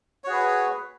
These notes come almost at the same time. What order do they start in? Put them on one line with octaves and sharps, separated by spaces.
C#5 F#4 G#4 B4